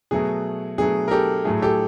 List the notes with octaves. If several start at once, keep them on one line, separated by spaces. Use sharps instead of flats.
B2 F#3 A3 G#4
B2 F#3 A3 G#4
A#4
G4 A4
A2 F#3 A3 G#4
G4 A4